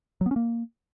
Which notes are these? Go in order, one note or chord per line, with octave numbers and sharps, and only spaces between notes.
F#3
B3
C#4
A#3